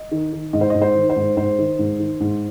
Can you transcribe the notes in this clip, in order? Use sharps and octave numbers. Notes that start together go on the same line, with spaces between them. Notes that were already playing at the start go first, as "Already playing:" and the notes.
Already playing: D#5
D#3
D#3
G#2 D#5
C5
G#2 D#5
C5
D#3
C5
G#2
G#2 C5
D#3
G#2
D#3
G#2